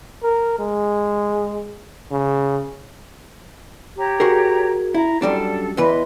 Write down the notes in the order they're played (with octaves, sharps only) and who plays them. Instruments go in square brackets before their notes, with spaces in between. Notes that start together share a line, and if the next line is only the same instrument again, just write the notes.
[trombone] A#4
G#3
C#3
[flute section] G4 C#5 A#5
[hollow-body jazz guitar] F#4 G#4 A#4
[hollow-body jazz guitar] E4 [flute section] A#5
[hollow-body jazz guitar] F#2 G3 D4 [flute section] A4
[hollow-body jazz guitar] E2 E3 B4 [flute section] D#5 E5 C6